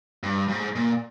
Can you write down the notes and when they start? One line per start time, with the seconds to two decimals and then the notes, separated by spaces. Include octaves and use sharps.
0.23 G2
0.48 G2
0.52 G#2
0.76 A#2